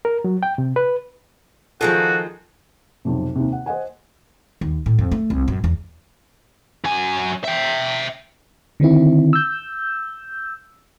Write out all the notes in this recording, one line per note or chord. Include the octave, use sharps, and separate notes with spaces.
A#4
F#3
G5
C3
B4
D#3 F3 G#3 F4 F#4 A4
B1 F2 C3
D#2 C3
F#5
C5 D#5 F#5 G#5
D#2
A2
F2
A3
C2
F#2
E2
F#2 G#5
E5 G5
D3 D#3 C4 E4
E6 G6